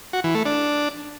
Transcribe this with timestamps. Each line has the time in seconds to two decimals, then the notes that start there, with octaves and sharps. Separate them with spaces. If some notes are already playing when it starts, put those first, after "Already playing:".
0.13 F#4
0.24 E3
0.35 A3
0.46 D4